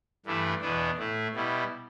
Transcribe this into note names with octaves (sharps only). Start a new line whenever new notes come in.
G2 E3 A3 D4
E2 B2 B3 D4
A2 A3 E4
B2 G3 E4